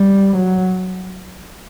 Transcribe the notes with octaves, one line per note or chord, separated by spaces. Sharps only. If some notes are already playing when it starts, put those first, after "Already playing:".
Already playing: G3
F#3